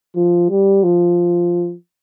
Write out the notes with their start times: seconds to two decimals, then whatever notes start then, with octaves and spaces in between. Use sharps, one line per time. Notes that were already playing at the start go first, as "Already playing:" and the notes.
0.16 F3
0.50 G3
0.83 F3